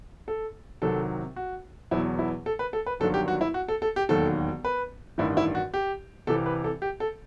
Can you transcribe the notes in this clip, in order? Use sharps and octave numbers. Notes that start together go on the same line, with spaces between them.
A4
C2 C3 D#3 F#3 A4
F#4
E2 B2 F#3 E4
E4
A4
B4
A4
B4
G1 G2 D#3 F#3 A4
G4
F#4
E4
F#4
A4
A4
G4
E1 D#2 D#3 F#3 A4
B4
A1 G2 D#3 E4
E4
F#4
G4
C2 C3 E3 A4
B4
A4
G4
A4